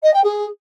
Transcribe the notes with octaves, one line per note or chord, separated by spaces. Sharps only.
D#5
G5
G#4